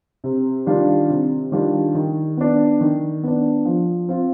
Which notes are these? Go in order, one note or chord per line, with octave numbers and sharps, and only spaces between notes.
C3
D#3 G3 D4 F4
C3
D#3 G3 D4 F4
D#3
B3 D4
D#3
B3 D4
F3
C4 F4